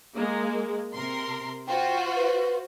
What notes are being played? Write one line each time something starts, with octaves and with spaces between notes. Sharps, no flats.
G#3 A#3
C3 A#4 C6
F4 F#4 C5 G5
B4